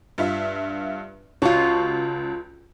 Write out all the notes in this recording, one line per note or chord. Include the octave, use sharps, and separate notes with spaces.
G2 F4 E5
C#2 F4 F#4 C#5 A5